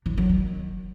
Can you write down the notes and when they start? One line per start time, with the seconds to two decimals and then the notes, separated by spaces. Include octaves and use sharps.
0.06 E3
0.18 F#3
0.29 D#3